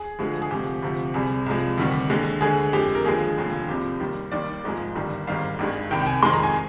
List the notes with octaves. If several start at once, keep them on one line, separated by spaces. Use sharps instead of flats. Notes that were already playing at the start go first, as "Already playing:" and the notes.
Already playing: G#4
D2 D3 F3 G#3
G#4
D2 C3 F3 G#3 G4
D2 C3 F3
C2 C3 G3 G#4
C2 C3 F3 G#3
D2 C3 D#3 G3
D#2 D3 G#3
D2 D3 G#3 G#4
F2 D3 G#3 G4
A#4
D#2 D3 F3 G#3 G#4
F1 D#2 D3 F3
C2 C3 F3 G4
D#2 D#3 G3
D#2 D#3 G3 D5
G#1 G#2 F3 G#3
G1 G2 D#3 G3
G#1 G#2 D#3 G3 F5
G#1 G2 D#3 G#3
C2 C3 D#3 G5
G5
G#5
F2 D#3 G#3 C6
A#5
G#5